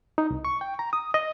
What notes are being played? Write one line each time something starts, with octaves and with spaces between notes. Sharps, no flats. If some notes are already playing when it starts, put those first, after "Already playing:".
D#4
C2
C#6
G5
A#5
D#6
D#5